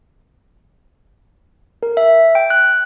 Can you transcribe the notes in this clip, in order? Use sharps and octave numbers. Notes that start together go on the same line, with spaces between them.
A#4
E5
G5
F#6